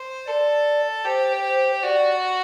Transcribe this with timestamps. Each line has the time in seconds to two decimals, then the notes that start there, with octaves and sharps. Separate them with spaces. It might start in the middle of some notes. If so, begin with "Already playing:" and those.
Already playing: C5
0.27 A4 D5
1.05 G4 C5
1.44 C5
1.83 F#4 D5